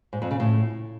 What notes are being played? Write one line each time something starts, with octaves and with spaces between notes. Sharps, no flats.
G#2
F2
C#3
A2